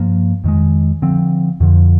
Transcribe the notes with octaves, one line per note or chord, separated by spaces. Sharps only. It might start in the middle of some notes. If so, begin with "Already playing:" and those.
Already playing: G2 F3 A#3
F2 D#3 G#3
D3 F3 C4
F2 D3 F3